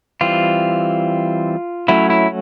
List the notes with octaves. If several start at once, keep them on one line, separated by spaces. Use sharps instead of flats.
E3 G3 C4 F4
F#3 A3 C#4 E4
E4